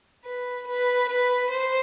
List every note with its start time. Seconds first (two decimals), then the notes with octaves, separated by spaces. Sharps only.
0.25 B4
0.67 B4
1.09 B4
1.50 C5